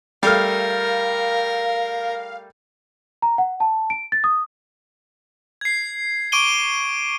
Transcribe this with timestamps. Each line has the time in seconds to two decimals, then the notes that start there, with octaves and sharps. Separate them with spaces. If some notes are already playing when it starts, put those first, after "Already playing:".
0.23 G3 A3 A#4 F5 F6
3.22 A#5
3.38 F#5
3.60 A5
3.90 D7
4.12 A6
4.24 D#6
5.61 G#6 C7
6.32 C#6 D6 D7 D#7 G7